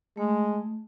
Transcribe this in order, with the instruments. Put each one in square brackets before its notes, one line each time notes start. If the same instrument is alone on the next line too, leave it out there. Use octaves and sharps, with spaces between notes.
[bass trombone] G#3 [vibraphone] A3